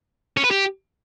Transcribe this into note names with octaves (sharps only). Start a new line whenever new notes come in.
C#4
B4
G4